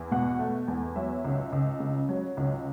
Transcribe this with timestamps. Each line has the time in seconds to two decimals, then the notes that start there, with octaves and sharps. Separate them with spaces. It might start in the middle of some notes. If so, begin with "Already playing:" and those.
Already playing: E2
0.11 B2 F#5
0.39 A3
0.68 E2
0.96 F#3 E5
1.25 C#2
1.53 C#2
1.80 C#3
2.09 F#3
2.37 C#2